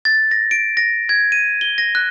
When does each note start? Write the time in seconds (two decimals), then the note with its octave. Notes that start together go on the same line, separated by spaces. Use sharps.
0.05 A6
0.31 A#6
0.51 D7
0.77 A#6
1.09 G#6
1.32 D#7
1.61 G7
1.78 A#6
1.95 F#6